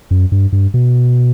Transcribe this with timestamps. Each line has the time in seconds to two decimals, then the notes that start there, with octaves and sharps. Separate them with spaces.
0.11 F#2
0.32 G2
0.52 G2
0.74 B2